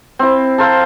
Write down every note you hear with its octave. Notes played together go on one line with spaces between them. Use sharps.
C4 E4
A4 A#4 C5 F5